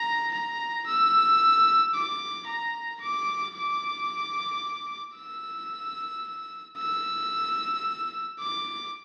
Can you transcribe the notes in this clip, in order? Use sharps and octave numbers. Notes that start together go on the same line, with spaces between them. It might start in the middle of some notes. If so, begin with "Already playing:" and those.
Already playing: A#5
A#5
E6
D6
A#5
D6
D6
E6
E6
D6